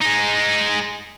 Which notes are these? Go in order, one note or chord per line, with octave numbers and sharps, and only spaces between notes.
G#3 D#4